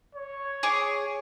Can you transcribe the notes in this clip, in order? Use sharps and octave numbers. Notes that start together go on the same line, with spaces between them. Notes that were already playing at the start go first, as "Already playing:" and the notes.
C#5
G#4 D6